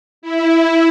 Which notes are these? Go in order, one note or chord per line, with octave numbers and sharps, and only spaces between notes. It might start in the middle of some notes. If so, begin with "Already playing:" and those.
E4